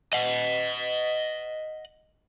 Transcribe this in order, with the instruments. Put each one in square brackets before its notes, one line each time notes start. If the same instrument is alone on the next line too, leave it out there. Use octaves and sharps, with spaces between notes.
[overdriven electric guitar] D#5 F#5